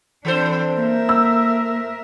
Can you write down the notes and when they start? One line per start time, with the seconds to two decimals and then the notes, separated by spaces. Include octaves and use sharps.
0.25 E3 C4 D4 A4 C5
0.76 A#3 A#4 E5
1.09 E6